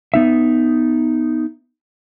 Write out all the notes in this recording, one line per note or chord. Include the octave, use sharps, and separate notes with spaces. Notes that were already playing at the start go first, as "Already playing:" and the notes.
B3 D#4 E5